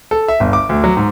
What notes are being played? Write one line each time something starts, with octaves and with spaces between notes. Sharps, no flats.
A4
E5
G1
D6
D2
F#3
G#2